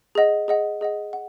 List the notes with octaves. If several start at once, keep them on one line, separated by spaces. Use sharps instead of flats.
G#4 D#5 F#5
G#4 D#5 F#5
G#4 D#5 F#5
F#5